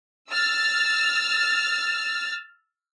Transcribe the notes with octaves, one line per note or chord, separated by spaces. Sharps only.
E6 F6 A6